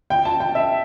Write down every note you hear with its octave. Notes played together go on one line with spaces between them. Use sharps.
G5
A5
G5
E5